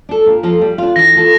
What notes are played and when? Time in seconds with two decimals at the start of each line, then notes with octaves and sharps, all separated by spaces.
0.09 D4 A4
0.26 A#2
0.43 F3 A#3 F4 A4
0.61 G3
0.78 D4 F4
0.96 E3 A#6
1.13 A#3 F4 A4